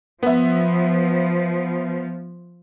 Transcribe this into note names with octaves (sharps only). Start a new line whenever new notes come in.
F3 B3 E5